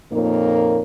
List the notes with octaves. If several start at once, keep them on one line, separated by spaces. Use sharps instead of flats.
F2 A#2 A#3 D#4 A#4 C#5